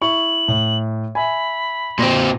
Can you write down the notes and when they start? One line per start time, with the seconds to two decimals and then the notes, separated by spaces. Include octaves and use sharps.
0.02 E4 C#6 F#7
0.48 A2
1.15 E5 G#5 B5
1.99 A#2 C4 C6 A#6